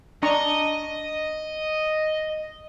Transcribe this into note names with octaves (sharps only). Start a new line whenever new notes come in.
D4 D#5 A#5 C#6